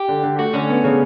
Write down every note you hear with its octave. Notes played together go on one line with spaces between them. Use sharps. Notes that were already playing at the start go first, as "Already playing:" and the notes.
Already playing: G4
D3
D3
A3 F#4
D3 C#4
B3
C#3